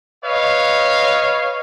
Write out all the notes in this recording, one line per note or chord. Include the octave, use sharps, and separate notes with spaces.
B4 C#5 D#5 F5